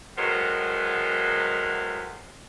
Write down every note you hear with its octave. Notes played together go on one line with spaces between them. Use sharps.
A2 F#3 G#3 B3 A#4 C5